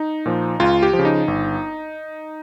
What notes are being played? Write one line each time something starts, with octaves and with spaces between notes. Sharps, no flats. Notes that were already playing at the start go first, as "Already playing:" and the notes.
Already playing: D#4
A#2 F3
C#2 F4
G4
F3
C#3
D#4
G1